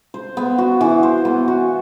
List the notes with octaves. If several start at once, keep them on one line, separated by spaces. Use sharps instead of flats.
C5
B3
F#4
E3
C5
B3
F#4